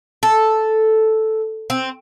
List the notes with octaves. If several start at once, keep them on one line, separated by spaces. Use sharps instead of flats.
A4
C4